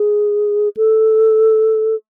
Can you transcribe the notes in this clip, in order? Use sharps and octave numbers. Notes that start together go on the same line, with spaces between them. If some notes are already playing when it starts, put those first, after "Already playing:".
Already playing: G#4
A4